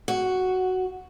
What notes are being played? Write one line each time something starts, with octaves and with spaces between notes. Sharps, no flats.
F#4